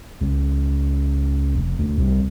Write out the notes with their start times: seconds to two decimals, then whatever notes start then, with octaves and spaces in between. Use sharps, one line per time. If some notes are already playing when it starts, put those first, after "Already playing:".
0.21 C#2
1.55 F1
1.78 D2
1.98 C2